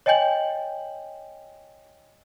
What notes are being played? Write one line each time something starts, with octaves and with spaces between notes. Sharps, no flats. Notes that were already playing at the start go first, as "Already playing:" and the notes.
C#5 D#5 G5 G#5 G6 F#7